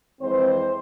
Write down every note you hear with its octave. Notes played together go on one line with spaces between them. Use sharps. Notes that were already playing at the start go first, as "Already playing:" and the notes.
F2 E3 G#3 C4 C5